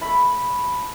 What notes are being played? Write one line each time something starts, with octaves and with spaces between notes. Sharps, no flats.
A3 E4 B5